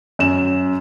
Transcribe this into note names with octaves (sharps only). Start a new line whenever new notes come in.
F#2 E7